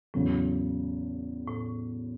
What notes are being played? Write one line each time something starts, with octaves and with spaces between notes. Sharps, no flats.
E2 A2 C#3 F#3
A2